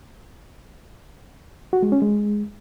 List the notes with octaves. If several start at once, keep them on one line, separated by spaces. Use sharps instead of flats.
F#4
G#3
C#4
G#3